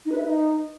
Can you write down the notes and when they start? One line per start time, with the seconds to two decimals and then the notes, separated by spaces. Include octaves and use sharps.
0.06 D#4
0.12 B4
0.18 E5
0.24 D#4